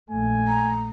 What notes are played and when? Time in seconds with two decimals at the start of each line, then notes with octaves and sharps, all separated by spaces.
0.10 A#1 A3 G#5
0.48 A#5